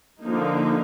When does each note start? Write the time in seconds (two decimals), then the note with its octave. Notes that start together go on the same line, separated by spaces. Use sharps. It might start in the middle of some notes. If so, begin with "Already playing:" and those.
0.23 D3 F3 A#3 D#4